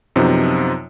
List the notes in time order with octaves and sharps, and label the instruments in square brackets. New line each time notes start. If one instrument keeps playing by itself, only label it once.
[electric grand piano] F#2 C3 F3 B3 D#4